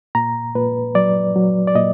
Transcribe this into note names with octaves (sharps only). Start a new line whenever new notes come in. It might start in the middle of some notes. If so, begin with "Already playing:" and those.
A#2 A#5
A#2 B4
F#3 D5
F#3
D5
A#2 D#5